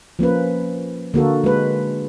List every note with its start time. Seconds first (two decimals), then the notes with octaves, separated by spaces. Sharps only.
0.19 F3 A#3 C#4 B4
1.14 D3 A#3 F#4 A4
1.44 G#3 B4